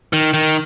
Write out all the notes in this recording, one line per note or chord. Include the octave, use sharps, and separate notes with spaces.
D#3
D#3